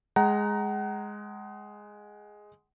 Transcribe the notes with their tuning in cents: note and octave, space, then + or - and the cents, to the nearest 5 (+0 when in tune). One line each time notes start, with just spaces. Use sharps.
G#3 +0 F#5 +35 A#5 +0